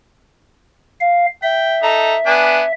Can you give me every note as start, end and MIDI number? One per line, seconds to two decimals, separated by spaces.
1.01 1.26 77
1.43 2.72 76
1.43 1.77 79
1.83 2.15 63
1.83 2.15 69
1.83 2.15 82
2.26 2.61 59
2.26 2.61 62
2.26 2.61 80